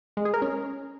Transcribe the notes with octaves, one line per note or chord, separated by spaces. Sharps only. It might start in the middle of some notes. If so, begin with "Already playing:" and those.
G#3
G#4
A#4
C#4